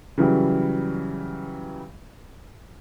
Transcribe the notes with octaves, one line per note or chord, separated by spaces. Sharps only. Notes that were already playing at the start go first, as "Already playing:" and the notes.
C#3 E3 F#3 G3